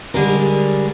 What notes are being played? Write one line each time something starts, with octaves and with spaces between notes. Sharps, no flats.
D3 G3 G#3 A#4